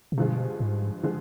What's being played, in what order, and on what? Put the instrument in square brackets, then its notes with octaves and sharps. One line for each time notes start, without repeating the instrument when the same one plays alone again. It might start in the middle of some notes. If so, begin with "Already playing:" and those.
[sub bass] C3
[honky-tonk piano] G2 D3 F3 G#3 [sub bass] B2
[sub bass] G#2
[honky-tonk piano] D3 F3 G#3